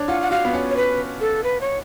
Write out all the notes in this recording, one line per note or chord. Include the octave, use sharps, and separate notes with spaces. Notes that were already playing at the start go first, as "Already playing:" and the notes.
Already playing: D4 C#5
F4 F#5
F#5
F#4 F5
B3
C#4
C#5
B4
A4
B4
C#5